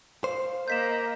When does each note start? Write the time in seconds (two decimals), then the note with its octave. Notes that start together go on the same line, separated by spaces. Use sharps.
0.24 C5 F5
0.68 A#3 D#5 G6 B6 E7